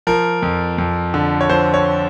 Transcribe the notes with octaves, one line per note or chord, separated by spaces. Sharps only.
F3 A#4
F2
F2
D3
C#5
F3 C5
C#5